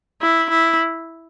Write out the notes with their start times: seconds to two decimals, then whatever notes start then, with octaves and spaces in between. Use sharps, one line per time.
0.22 E4
0.50 E4